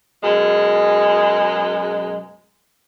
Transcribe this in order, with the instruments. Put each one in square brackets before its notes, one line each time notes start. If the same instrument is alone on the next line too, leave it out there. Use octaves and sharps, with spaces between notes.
[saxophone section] F#2 B2 G#3